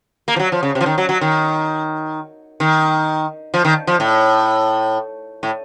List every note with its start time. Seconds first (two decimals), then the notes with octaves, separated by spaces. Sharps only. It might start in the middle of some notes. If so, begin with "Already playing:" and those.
0.28 A#3
0.36 F3
0.39 F#3
0.52 F3
0.63 C#3
0.75 C3
0.81 F3
0.86 D#3
0.98 F#3
1.09 F#3
1.21 D#3
2.60 D#3
3.54 F3
3.65 D#3
3.87 F3
4.00 A2
5.43 A2